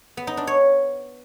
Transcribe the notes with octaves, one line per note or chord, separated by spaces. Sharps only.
B3
D#4
D4
C#5